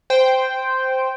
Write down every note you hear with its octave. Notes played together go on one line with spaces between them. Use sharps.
C5 G5